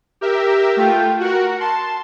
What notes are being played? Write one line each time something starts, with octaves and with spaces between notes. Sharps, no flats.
G4 A#4 E5
A3 F4 G5
F#4 A#4 F#5
A5 C6